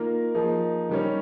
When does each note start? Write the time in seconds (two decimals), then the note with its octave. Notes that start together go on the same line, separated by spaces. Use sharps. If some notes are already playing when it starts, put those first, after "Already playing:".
Already playing: D#3 A#3 F4 A#4
0.35 F3 A#3 D#4 G#4
0.89 D#3 G3 C#4